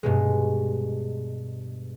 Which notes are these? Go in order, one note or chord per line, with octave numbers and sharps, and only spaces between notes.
G2 B2 G#3